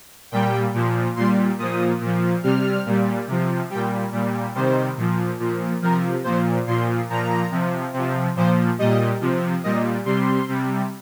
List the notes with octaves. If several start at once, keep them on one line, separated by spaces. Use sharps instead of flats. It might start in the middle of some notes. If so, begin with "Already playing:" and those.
A#2 G3 G5
A#2 F3
A#2 G3 C6
A#2 F3 D#6
A#2
F3
C3 G3 F6
A#2 G3
C3 F3
A#2 G3 G5
A#2 G3
C3 D#3 G3 C5
A#2 F3
A#2 F3
C3 F3 A#4
A#2 F3 C5
A#2 F3 C6
A#2 F3 A#5
C3 F3
C3 F3
A#2 F3 C5
A#2 G3 D#5
C3 F3
A#2 G3 D#5
C3 G3 C6
C3 G3